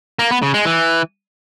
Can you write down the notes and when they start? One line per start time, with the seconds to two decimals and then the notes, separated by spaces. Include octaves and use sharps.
0.19 A#3
0.31 B3
0.42 C#3
0.54 G#3
0.66 E3